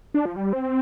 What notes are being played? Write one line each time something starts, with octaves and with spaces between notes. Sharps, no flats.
D4
F3
G3
C4